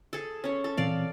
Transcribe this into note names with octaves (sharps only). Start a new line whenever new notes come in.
G#4 A4
C#4 C#5
A4
A#2 E3 C4 D5 F5